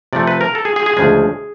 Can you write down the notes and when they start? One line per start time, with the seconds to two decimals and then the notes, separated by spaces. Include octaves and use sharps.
0.13 C3 F3 A3 D5
0.27 B4
0.41 A#4
0.55 A4
0.65 G#4
0.76 G#4
0.86 G#4
0.97 D2 C#3 F3 G#3 G#4